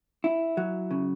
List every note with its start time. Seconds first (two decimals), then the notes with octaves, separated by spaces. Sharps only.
0.24 E4
0.57 F#3
0.91 C#3